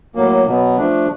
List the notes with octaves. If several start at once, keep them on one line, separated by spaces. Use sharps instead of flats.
A2 F#3 A#3
B2 F#3 B3
F3 A3 D4